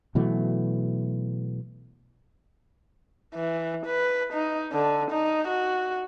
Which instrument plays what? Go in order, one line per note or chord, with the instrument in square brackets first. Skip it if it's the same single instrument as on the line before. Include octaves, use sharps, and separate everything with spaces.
[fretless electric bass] B2 E3 F#3 A3
[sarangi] E3
B4
D#4
D3
D#4
F#4